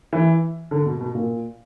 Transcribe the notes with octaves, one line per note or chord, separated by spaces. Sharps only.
E3
D3
B2
B2
A#2